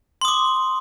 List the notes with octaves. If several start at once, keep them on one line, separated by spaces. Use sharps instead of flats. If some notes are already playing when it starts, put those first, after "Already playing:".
C6 D6 D#6